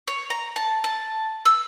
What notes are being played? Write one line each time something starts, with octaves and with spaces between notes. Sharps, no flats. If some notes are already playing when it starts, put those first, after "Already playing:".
C#5
A#5
A5
A5
E6